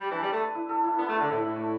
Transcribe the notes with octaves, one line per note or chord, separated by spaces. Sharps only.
G3
E3 D4
G3
D4
A3
B4
E4
A4
E4
B3 D4
A3
B4
D3
A2 E5
A2 E4
A3